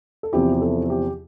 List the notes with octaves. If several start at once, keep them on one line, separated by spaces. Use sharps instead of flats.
A4
E2 C3 F3 C4 E4 G4
G4
A4
G4